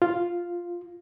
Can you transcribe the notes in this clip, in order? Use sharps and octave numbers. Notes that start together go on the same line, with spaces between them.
F4